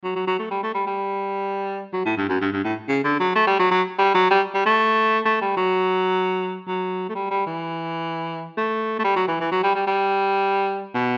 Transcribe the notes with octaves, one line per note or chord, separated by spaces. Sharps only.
F#3
F#3
F#3
A3
G3
A3
G3
G3
F#3
A2
G2
F#2
G2
G2
A2
C#3
D3
F#3
A3
G3
F#3
F#3
G3
F#3
G3
G3
A3
A3
G3
F#3
F#3
A3
G3
G3
E3
A3
A3
G3
F#3
E3
E3
F#3
G3
G3
G3
B2